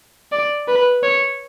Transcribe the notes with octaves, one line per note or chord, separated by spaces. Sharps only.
D5
B4
C#5